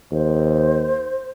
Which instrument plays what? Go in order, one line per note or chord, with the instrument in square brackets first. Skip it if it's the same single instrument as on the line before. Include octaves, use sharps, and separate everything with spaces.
[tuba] D#2 [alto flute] C5